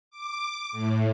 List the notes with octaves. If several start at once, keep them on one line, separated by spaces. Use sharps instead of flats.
D6
A2